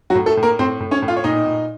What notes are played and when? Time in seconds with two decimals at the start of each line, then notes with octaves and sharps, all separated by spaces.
0.10 F#3 F#4
0.15 A2
0.26 A3 A4
0.37 A2
0.43 A#3 A#4
0.59 A2 C4 C5
0.81 A2
0.91 C#4 C#5
1.02 A2
1.08 F4 F5
1.17 C#5
1.24 A#2 D#4 D#5
1.46 A#2